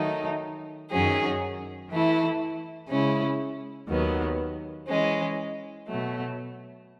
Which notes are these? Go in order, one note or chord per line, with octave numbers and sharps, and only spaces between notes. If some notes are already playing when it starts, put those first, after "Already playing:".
Already playing: D#3 F#3 A3 D#4
F#2 D#3 F#3 C#4 G#4
E3 A3 E4
C#3 G#3 C#4 E4
D#2 D#3 F#3 B3
E3 G#3 C#4
B2 F#3 A3